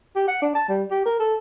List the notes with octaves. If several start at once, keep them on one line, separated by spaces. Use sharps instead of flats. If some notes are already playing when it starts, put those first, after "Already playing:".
G4
F#5
D4
A5
G3
G4
A#4
A4